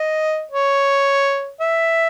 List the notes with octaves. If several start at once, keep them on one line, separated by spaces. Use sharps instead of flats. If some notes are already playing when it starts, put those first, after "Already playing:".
Already playing: D#5
C#5
E5